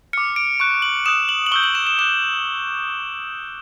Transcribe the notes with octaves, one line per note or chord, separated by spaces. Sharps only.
D6 F6 C#7
D7
C#6 F#6 D7
F#7
D#6 F#6 E7
F#7
F#7
C#6 E6 G6 G7
F#7
E7
E7
D6 F#6 E7